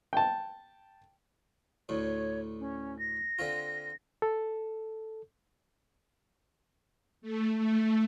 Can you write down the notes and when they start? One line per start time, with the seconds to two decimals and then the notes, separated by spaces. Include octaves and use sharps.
0.13 G5 A5
1.89 D2 A2 C#5
2.59 C#4
2.99 A#6
3.39 D3 C4 F4
4.22 A4
7.22 A3
7.58 A3